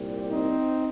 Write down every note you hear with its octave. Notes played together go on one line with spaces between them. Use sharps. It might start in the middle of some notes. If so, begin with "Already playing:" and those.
Already playing: C2 A#2 G3
C4 D#4